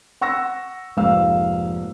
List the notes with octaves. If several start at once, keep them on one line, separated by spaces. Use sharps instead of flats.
F#5 C#6 E6 A#6
F1 G#2 A#3 F5 E6